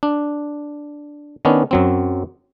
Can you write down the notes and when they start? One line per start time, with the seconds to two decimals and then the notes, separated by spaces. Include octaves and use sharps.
0.03 D4
1.45 D#3 B3 C#4 D4
1.71 F#2 F#3 C4